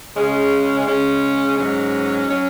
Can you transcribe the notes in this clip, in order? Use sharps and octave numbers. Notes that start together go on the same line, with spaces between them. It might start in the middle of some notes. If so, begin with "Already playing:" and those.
C#3 G#3 C#4
C#3 G#3 C#4
G#2 F#3 C#4
F#3 C#4